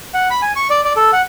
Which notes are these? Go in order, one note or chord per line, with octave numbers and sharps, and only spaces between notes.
F#5
B5
G#5
C#6
D5
D5
A4
F#5